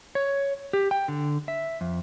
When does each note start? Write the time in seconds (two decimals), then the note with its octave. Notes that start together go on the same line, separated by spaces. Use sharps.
0.15 C#5
0.73 G4
0.91 G5
1.08 D3
1.48 E5
1.81 F2